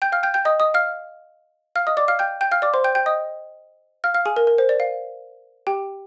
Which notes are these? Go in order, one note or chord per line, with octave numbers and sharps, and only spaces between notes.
G5 G6
F5 F6
G5 G6
G5 G6
D#5 D#6
D#5 D#6
F5 F6
F5 F6
D#5 D#6
D5 D6
F5 F6
G5 G6
G5 G6
F5 F6
D5 D6
C5 C6
G5 G6
G5 G6
D#5 D#6
F5 F6
F5 F6
G#4 G#5
A#4
A#4
C5
D5
F5
G4 G5